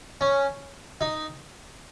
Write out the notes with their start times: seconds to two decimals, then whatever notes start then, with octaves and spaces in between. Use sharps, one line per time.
0.21 C#4
1.01 D#4